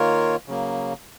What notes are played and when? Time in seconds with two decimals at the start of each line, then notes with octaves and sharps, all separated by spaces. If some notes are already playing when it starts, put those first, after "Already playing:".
Already playing: D#3 A#3 F4 A#4 C#5
0.48 C#3 F#3 A#3